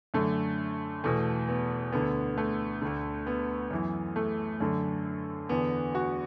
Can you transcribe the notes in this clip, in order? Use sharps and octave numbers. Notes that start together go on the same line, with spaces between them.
F#2 D3 A3
E2 B2 A3
B3
D2 D3 B3
A3
D2 D3
B3
F#2 E3
A3
F#2 D3 A3
E2 D3 B3
F#4